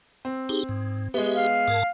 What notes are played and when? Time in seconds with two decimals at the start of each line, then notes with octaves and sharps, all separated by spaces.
0.25 C4
0.49 D#4 G4 G#4
0.69 G#2
1.14 G#3 B3 G4 E5
1.33 F5
1.68 G#2 A#4 A5